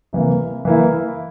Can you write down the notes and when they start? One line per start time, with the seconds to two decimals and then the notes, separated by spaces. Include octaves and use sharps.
0.13 C3 E3 A#3
0.65 E3 A#3 E4